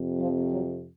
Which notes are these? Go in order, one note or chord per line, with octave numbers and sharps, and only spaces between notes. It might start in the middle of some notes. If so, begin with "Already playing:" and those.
Already playing: F2 C3
F3
F#3